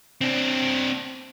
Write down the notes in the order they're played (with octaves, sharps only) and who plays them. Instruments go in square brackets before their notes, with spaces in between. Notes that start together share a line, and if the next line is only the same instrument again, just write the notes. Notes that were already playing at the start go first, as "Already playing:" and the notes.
[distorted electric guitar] C4 D4